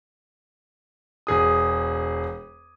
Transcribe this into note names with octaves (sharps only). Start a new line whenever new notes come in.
E1 G#4 D#6